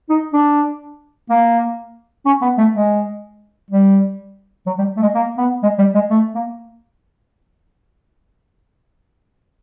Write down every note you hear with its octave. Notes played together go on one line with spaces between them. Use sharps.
D#4
D4
A#3
C#4
B3
A3
G#3
G3
F#3
G3
A3
G#3
A#3
B3
G#3
G3
G#3
A3
A#3